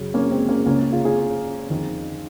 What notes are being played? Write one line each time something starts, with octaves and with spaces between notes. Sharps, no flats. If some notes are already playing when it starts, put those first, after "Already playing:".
Already playing: F#2 C#3
A#3 C#4
G#3 C4
A#3 C#4
C#2 C#3 A#3 C#4
F4 G#4
F4 G#4
F2 D#3